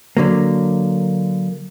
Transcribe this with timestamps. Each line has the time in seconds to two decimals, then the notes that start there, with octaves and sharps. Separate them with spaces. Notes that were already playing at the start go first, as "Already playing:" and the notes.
0.17 D3 F#3 A#3